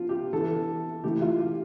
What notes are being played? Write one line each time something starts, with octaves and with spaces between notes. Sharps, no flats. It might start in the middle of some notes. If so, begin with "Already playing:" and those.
Already playing: F3 B3 D4 F4
G4
E3 B3 D4 A4
E3 A3 E4 G4
F4
G4